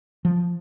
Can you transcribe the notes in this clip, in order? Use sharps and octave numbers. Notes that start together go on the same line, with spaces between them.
F3